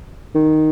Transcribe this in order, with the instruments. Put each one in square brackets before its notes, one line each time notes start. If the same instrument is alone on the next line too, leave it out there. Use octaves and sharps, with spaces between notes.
[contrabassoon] D#3